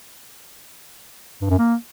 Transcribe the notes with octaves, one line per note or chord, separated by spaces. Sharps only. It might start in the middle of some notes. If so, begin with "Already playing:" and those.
G2
F#2
A#3